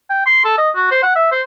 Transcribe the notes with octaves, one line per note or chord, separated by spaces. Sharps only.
G5
C6
A4
D#5
F#4
C5
F#5
E5
C5